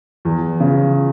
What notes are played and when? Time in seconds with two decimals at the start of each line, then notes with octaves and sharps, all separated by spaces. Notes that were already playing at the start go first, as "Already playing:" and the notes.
0.25 E2
0.60 C#3 F3